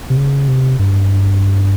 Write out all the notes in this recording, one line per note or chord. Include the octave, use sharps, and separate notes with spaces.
C3
C#3
C3
G2